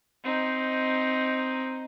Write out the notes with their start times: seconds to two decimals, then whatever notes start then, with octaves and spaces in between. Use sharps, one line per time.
0.24 C4 D#4